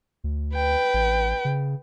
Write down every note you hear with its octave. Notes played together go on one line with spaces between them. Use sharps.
D2
B4 G5
A1
C#3